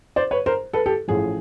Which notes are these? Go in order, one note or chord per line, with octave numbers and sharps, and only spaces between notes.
C5 D5
B4 C#5
A#4 C5
A4 B4
G4 A4
A1 A2 F3 G#4